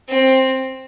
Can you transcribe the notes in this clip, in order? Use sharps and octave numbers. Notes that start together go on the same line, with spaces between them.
C4